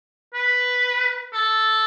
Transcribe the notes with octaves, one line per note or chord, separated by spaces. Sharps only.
B4
A4